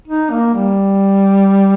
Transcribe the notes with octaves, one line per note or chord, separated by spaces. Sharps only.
D#4
A#3
G3